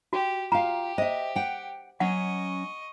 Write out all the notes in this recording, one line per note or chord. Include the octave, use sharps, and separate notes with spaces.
F#4 G4
F4 G4 F5 A#5
C5 D#5 E5
F#5 G5
F#3 C#4 D#5 F#5 C#6